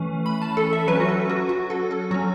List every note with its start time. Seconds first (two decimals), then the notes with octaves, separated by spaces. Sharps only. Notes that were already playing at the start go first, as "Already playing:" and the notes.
Already playing: E3 A3 C#4
0.26 B5
0.42 A5
0.57 A4
0.73 E5
0.87 F#3 C#4 B4
1.00 F#4
1.08 A4
1.30 F#4
1.49 F#4
1.70 A4
1.91 A4
2.11 F#3 C#4 F#4